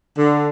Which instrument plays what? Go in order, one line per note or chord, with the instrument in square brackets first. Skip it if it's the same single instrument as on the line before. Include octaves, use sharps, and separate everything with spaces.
[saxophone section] D3